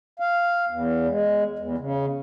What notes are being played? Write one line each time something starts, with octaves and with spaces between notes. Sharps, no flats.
F5
E2
G#3
E2
C#3